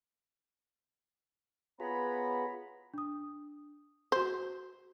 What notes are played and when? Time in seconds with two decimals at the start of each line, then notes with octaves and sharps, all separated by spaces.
1.80 B3 F4 G#4 B4 C#5 A#5 B5
2.94 D4 D#6
4.12 F#4 C5 G6